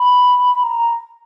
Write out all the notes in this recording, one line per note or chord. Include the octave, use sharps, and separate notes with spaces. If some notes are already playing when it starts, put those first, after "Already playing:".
Already playing: B5
A#5